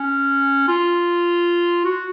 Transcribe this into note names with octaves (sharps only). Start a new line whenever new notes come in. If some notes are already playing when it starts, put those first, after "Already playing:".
Already playing: C#4
F4
F#4